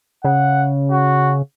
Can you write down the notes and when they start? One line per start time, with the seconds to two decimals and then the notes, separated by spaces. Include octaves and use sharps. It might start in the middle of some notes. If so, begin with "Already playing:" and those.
0.24 C#3 F#5
0.91 F#4